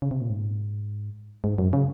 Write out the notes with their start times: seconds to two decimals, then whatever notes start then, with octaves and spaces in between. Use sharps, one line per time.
0.02 C#3
0.11 C3
0.21 A#2
0.30 G#2
1.44 G#2
1.58 F#2
1.73 C#3